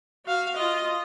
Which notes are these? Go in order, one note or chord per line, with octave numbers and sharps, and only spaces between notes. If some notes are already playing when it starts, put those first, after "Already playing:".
F#4 F5
F4 D#5